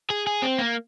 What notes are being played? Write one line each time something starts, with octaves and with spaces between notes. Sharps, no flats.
G#4
G#4
C4
A#3